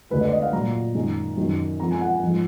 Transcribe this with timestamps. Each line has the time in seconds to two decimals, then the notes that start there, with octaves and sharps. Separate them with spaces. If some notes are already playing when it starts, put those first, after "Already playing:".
0.10 D2 D3 G#3 B4
0.21 D5
0.32 D#5
0.42 F5
0.53 A#2 F#3 A#5
0.94 F#2 D#3 G#3
1.37 F#2 D#3 F#3
1.80 F2 F3 G#3 A#5
1.91 G#5
2.01 F#5
2.12 G#5
2.22 G#2 F3 G#3